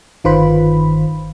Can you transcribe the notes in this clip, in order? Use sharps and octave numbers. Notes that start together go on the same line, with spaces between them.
G1 D#3 F4 B4 C5 B5